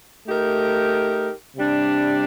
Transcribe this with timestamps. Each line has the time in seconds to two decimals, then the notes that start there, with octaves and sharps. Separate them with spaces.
0.28 A3 D#4 G4 A#4
1.57 C3 G3 D4